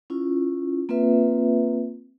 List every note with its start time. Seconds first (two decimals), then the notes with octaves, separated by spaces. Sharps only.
0.10 C#4 E4 F4
0.89 A#3 C4 F4 B4 E5